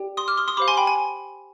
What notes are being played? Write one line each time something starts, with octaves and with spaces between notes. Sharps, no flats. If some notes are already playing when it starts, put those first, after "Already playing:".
Already playing: G4 D5 G5
C6 D#6
D6 F6
C6 D#6
C6 D#6
G4 C5 F5 B5 D6
G#5 C6
G5 B5
G#5